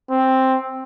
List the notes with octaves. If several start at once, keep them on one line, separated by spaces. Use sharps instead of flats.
C4